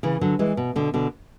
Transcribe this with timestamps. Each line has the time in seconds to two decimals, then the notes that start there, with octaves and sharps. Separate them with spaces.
0.03 C#3 E3
0.21 D3 F#3
0.39 E3 G#3
0.57 B2
0.76 B2 D3
0.94 B2 D3